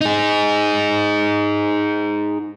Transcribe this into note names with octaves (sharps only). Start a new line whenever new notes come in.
D#4 G#4